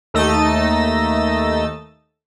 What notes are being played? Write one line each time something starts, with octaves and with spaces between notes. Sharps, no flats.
D#2 A3 D#4 D#5 E6 A6